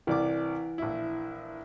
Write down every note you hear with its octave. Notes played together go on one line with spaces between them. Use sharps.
C2 E3 D5 D6
A#1 E4